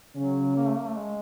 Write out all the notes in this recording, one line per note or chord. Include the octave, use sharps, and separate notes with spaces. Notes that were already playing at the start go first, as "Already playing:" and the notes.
C#3 F#3 C#4
A#3
A3
A#3
A3
G#3